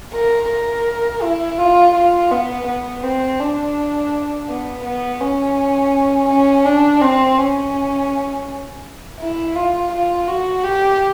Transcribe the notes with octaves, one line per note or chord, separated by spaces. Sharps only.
A#4
A#4
E4
F4
F4
B3
B3
C4
D4
B3
B3
C#4
C#4
D4
C4
C#4
E4
F4
F4
F#4
G4